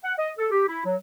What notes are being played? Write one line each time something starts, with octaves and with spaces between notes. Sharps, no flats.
F#5
D#5
A4
G4
E4
F#3